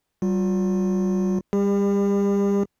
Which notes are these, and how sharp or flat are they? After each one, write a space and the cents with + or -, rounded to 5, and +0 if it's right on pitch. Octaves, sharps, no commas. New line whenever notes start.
G3 -35 F4 +35
G3 +25 G4 +40